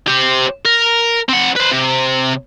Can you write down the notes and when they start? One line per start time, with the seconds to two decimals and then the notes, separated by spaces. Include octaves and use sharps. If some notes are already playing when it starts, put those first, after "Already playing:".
0.08 G4 C5
0.65 A#4
1.29 C4 F#5
1.56 B4 C5
1.72 C3